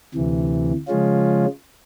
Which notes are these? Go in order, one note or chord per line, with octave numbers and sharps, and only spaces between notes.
D2 C3 E3
C#3 F3 G#3 C#4 F4